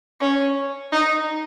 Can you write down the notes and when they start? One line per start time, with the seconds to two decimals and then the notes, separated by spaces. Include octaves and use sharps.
0.21 C#4
0.92 D#4